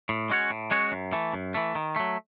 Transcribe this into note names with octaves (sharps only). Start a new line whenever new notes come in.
A2
G#3 C#4 F#4 C#5
A2
G#3 C#4 F#4 C#5
F#2
E3 A3
F#2
E3 A3
D#3
F#3 A3